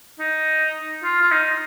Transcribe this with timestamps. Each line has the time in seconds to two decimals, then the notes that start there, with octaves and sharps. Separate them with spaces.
0.19 D#4
1.03 F4
1.21 F4
1.32 D#4